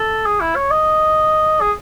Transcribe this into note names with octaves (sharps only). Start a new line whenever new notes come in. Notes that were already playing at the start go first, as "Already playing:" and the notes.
Already playing: A4
G#4
E4
C#5
D#5
G#4